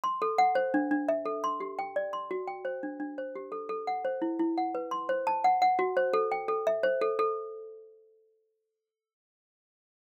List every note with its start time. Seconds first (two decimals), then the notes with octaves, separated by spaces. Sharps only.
0.04 C6
0.22 A4
0.38 F#5
0.55 C5
0.74 D4
0.91 D4
1.09 E5
1.26 A4
1.44 C6
1.60 G4
1.79 G5
1.96 D5
2.13 C6
2.31 F#4
2.47 G5
2.65 C5
2.83 D4
3.00 D4
3.18 C5
3.36 G4
3.52 A4
3.69 A4
3.87 F#5
4.05 C5
4.22 E4
4.39 E4
4.58 F#5
4.75 B4
4.91 C6
5.09 C5
5.27 A5
5.44 F#5
5.62 F#5
5.79 F#4
5.97 C5
6.13 A4
6.32 G5
6.48 A4
6.67 E5
6.83 C5
7.02 A4
7.19 A4